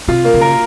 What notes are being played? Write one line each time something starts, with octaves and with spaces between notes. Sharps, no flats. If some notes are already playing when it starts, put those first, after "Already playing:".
C3 F4
A#3
C#3
A#4